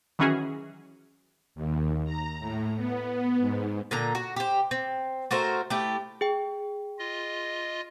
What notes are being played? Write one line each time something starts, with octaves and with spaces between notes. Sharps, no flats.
D#3 E3 F#3 C#4 F#4 G#4
D#2
A#5
A2
B3
G#2
A#2 D3 A#5
F#4
G4 C5
C4
A3 F#4 A#4 C5
A3 E4 G4
G#4 G5
F4 D#5